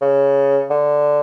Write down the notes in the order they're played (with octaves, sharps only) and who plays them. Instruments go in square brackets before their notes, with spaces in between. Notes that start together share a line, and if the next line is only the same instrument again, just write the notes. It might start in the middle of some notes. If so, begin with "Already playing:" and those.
[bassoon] C#3
D3